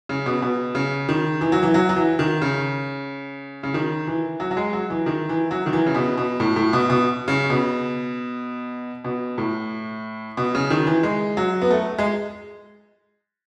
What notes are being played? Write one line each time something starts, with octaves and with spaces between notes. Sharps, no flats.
C#3
B2
B2
C#3
D#3
E3
F#3
E3
F#3
F#3
E3
D#3
C#3
C#3
D#3
E3
F#3
F#3
G#3
F#3
E3
D#3
E3
F#3
D#3
E3
C#3
B2
B2
A2
A2
B2
B2
C#3
B2
B2
A2
B2
C#3
D#3
E3
G#3
F#3
B3
A3
G#3